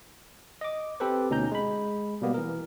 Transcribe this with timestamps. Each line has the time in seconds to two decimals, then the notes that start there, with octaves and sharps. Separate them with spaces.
0.61 D#5 D6
1.00 C4 G4 A4 B4 C5
1.30 D2 B2 C#4 D#4 A#5 G6
1.52 G#3 B5
2.22 B2 G3 A#3 B3
2.34 E3 A#4